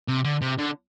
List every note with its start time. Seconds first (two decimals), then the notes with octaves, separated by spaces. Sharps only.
0.08 C3
0.24 D3
0.42 C3
0.58 D3